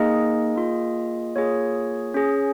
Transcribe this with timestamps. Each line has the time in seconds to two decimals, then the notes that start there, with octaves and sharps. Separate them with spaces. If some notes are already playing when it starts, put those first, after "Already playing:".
Already playing: A#3 D#4 G#4 D#5
0.56 A#3 F4 G#4
1.36 A#3 F4 G#4 C#5
2.14 C#4 G#4